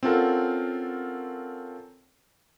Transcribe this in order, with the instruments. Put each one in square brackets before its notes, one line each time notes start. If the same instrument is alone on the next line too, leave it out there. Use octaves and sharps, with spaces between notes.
[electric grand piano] C4 C#4 F4 A4 A#4 F#5